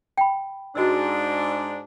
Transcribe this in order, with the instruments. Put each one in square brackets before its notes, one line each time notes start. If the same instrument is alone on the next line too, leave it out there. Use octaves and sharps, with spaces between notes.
[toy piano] G5 B5
[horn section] G#2 D4 [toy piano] F#4 D#5 E6